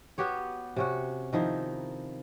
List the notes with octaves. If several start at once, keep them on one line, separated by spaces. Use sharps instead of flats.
B3 F#4 G4 C#5
C3 C#4 F#4
D#3 F3 D#4 E4